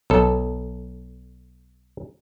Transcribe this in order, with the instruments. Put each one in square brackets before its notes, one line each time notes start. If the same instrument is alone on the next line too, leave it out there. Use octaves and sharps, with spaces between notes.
[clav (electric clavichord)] B1 A4